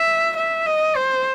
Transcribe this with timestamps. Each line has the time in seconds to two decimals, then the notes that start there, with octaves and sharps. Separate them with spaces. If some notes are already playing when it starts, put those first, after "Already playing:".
Already playing: E5
0.37 E5
0.66 D#5
0.96 C5